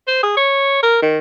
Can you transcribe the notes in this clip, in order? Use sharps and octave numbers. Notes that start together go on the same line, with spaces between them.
C5
G#4
C#5
A#4
D#3